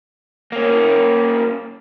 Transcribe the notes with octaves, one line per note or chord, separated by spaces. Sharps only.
A#3 C#4